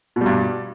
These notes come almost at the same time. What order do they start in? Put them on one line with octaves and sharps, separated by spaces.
B2 G3 G2